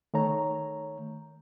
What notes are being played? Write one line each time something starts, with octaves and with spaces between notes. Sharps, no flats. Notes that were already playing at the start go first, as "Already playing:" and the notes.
D#3 A3 C#5 A#5